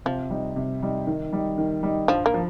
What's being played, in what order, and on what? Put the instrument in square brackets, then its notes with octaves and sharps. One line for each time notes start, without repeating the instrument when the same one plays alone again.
[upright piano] C3 [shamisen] F3
[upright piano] G3 D#4
C3
G3 D#4
D#3
G3 D#4
D#3
G3 D#4
[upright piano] G2 [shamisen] F3
[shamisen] A#3
[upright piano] F3